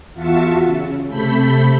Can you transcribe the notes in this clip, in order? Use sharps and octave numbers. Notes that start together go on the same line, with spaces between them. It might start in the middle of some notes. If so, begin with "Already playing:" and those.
E2 F4 F#4 E5 A5 C#7
C#3
C3 A3 A4 B5 G6 B6